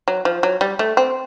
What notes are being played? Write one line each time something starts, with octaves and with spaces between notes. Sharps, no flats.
F#3
F3
F#3
G3
A3
C4